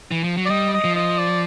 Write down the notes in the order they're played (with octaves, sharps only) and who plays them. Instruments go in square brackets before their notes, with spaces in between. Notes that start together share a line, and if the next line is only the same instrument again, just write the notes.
[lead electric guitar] E3
F3
F#3
[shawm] D5
[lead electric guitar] G3 [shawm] D#5
[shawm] D#5
[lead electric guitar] F3
[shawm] D#5
D5